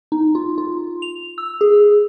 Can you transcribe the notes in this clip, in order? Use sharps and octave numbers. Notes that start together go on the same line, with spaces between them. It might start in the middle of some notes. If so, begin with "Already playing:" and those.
D#4
F4
F4
F7
E6
G#4